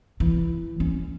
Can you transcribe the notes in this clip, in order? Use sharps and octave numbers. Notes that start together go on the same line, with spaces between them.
E3
C#4